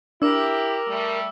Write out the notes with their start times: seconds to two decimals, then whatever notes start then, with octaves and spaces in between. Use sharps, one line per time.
0.22 D4 E4 G4 A#4 D6 E6
0.87 G3 A3